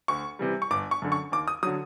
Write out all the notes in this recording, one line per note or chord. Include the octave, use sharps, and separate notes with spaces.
D2 C#6
C3 E3 G3
C#6
G1 D6
C#6
F#2 D3
C#6
D#2 D6
D#6
D3 F#3 D#6